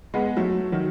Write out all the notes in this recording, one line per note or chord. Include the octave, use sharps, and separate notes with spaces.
G#3 B3
F#3 A3
D#3 F#3